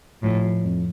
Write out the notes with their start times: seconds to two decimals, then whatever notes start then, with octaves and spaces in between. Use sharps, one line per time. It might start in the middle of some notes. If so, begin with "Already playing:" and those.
0.23 A2 F3
0.42 F3
0.63 F2